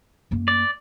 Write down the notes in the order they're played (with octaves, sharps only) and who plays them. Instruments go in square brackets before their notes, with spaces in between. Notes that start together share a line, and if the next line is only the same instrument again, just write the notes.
[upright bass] F#2 A#3
[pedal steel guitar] D5